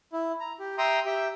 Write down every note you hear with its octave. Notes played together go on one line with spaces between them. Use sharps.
E4
A#5
G4
E5 G5 A#5 C6 D#6
G4 E5 G5